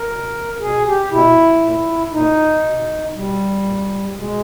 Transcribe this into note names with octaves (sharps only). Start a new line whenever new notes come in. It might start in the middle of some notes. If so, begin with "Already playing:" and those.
Already playing: A#4
B2
B2 G#4
G4
B2 E4
A#2
A#2 D#4
B2
B2 G3
A#2
B2 G#3